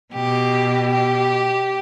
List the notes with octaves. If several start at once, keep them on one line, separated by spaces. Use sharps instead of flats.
B2 G4
G4